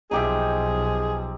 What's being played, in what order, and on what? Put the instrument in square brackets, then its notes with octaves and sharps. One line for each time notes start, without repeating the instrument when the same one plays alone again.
[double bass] B1 F3 [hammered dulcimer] D#4 G4 E5 [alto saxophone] G#4